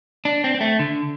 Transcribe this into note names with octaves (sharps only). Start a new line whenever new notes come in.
D4
C4
C4
A3
D3